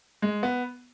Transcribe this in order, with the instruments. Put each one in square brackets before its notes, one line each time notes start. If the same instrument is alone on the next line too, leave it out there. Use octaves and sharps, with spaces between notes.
[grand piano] G#3
B3